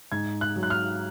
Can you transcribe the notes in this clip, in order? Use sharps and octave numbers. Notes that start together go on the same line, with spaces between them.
G#2 G#6
F#6
F#3
F#6
F6